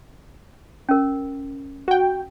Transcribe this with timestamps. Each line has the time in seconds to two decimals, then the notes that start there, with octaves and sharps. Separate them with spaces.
0.89 C#4 A#4
1.88 F#4 G5